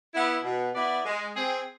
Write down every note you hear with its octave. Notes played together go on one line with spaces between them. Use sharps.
B3 E4
B2
B3 E4 B4 D5
G#3
C4 G#4